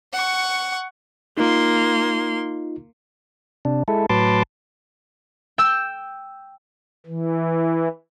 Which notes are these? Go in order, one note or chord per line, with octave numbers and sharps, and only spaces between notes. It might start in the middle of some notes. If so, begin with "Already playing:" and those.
F#5 C#6
A#3 D#4 F4 C6
C3 D4
G#3 E4 A4
A2 F#3 B4 A5 C6 D6
G5 E6 G6
E3